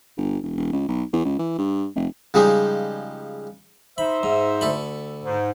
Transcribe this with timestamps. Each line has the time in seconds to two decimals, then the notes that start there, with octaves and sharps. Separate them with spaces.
0.17 G1
0.43 E1
0.57 E1
0.73 C#2
0.88 B1
1.13 E2
1.25 C#2
1.39 E3
1.58 G2
1.96 F1
2.34 C#3 F3 G3 G#3 D#4
3.98 D#4 C5 E5 B5
4.23 G#2
4.61 D2 A4 B5
5.24 G#2